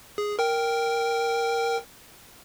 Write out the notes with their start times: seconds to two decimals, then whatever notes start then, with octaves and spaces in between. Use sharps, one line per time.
0.18 G#4
0.39 A#4 G5